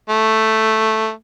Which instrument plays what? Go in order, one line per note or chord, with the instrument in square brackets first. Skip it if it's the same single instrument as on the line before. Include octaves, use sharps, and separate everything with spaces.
[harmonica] A3